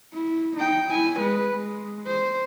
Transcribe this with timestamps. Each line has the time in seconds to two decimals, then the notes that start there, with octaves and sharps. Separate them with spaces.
0.14 E4
0.57 D#4 G5
0.89 E4 G#5
1.20 G#3 B4
1.55 G#3
2.07 C5